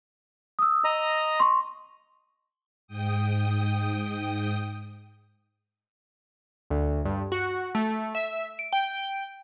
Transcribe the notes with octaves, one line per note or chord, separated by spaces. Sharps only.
D#6 E6
D#5 A#5
C6 C#6
G#2 G5 D#6
D2
G2
F#4
A3
E5
D7
G5